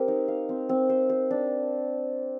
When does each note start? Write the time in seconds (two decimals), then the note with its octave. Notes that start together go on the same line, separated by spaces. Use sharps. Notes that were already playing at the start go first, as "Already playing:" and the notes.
Already playing: C4 G4 A#4
0.08 D#4
0.28 F5
0.49 C4
0.69 C4
0.90 C5
1.10 C5
1.31 D4